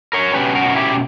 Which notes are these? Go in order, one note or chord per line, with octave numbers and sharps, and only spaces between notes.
A#4 C#5
B2 G3 C#4 G4 B4
F#4 A#4
E4 G4